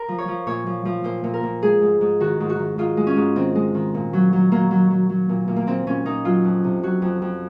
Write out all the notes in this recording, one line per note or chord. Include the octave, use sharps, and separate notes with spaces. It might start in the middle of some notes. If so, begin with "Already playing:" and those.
Already playing: A#4
F3
C#5
F3
A#2 C#5
F3
F3
A#2 C5
A#2
A#4
A#2
G#3 G#4
G#2
G#2
D#3 F#4
G#2
F#4
D#3
G#2 F4
G#3
C#4
G#2
D#3 C4
G#3
D#3
A#2
F#3
F#3
F#3 A#3
F#3
F#3
F#3
A#2
A#2
A#3
A#2 C4
A#2 C#4
A#2 D#4
F#3 F4
F2
C3
F#3 F#4
F2
F2